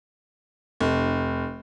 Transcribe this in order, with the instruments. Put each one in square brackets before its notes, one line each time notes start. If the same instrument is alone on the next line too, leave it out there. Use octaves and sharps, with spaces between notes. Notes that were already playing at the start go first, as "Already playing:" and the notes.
[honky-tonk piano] F1